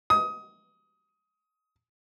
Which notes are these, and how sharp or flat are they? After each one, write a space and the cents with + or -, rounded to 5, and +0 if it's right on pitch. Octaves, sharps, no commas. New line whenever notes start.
D#6 +20